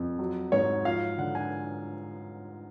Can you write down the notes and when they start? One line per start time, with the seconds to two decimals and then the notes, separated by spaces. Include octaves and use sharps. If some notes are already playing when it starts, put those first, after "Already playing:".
Already playing: F2
0.19 F#3
0.52 G#2 C#5
0.85 F3 F5
1.18 D3 F#5
1.35 G#5